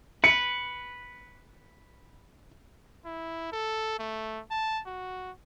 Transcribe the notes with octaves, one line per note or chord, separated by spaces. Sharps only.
B4 C#7
E4
A4
A3
A5
F#4